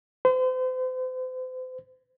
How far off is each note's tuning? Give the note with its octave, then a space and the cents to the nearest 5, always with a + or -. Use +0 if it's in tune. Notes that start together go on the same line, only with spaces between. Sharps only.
C5 -40